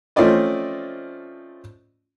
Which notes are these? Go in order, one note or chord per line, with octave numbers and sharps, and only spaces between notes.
F3 A3 C4 C#4 D5 D#5